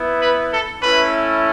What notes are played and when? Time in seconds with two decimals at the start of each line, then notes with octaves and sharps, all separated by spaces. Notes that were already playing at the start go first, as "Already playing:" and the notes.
Already playing: B3 E4
0.21 B4
0.52 A4
0.82 A3 C#4 E4 B4